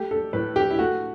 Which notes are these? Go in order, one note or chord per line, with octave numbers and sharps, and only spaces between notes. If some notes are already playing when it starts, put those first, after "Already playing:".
Already playing: A3 G4
A4
A2 B4
G4
E4
A3 F#4